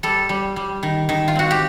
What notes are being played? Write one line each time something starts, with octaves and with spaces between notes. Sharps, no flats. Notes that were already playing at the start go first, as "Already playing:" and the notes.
G3 A4
G3
G3
D#3
D#3
F4
C4 F#4
G4